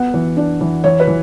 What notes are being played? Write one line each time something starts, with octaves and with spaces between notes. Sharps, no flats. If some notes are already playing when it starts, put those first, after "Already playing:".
Already playing: B3 F#5
E3
D4
E3
E3 C#5
B4
E3